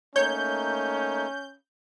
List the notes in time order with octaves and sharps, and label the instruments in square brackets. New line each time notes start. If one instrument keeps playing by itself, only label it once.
[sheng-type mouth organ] A3 A#3 D#4 [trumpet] C#4 [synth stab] C#5 [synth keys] G6